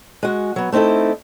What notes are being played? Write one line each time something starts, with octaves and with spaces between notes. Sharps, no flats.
G#3 F#4
F#3 B3
A3 C4 D#4 E4 A4